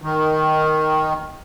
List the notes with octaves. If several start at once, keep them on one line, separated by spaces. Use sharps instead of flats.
D#3